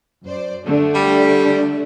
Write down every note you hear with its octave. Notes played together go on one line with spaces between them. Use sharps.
F#2 C5 D5
D3 A3 D4
G3